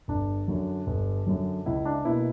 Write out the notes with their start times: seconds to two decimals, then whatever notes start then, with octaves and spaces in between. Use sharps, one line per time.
0.08 G1 D4
0.48 F#2 D3 F#3
0.87 G1
1.26 F#2 D3 F#3
1.66 C#2 E4
1.85 D4
2.05 B2 A#3 E4